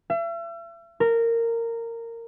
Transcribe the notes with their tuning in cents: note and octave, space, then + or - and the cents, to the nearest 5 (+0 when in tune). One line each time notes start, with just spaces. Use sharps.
E5 +40
A#4 -15